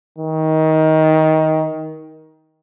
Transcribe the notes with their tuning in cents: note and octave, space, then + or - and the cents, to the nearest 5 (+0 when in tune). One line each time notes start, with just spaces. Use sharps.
D#3 +20